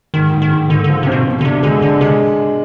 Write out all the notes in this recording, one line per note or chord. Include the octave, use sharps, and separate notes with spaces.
G#2 D#3
G#2
D#3
G#2
G#2 D3
D3 F3
C3
B2 C4
B2
D3
C3 D4
D3 G#3
D3 D4
C3 G#3